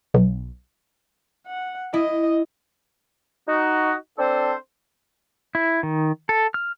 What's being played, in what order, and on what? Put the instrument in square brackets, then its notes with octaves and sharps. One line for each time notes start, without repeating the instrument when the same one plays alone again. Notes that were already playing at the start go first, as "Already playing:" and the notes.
[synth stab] B1
[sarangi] F#5
[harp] E4 [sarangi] D#5
[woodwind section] D#4 F#4
C4 D4 A4 C5
[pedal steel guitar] E4
D#3
A4
F6